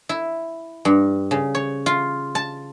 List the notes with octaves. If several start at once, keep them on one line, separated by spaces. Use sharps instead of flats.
E4
G2
C#3
C#5
F4
A5